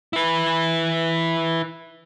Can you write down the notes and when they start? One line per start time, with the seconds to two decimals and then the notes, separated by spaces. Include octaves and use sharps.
0.13 E4 B4